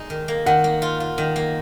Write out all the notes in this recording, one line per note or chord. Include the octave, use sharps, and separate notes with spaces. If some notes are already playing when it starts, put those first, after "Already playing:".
Already playing: G#3 D#4
D#3
A#3
D#3 F#5
A#3
F4
F4
D#3
A#3